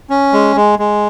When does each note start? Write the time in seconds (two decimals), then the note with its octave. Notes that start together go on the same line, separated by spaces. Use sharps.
0.10 C#4
0.33 G#3
0.56 G#3
0.79 G#3